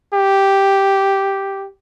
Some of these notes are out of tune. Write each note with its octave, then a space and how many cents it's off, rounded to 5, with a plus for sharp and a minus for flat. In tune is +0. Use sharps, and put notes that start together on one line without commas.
G4 -5